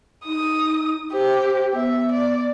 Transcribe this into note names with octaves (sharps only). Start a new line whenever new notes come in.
D#4 D#6
G4 C5
B3 E5
D5